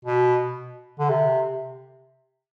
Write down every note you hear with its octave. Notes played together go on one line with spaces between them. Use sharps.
B2
D3
C3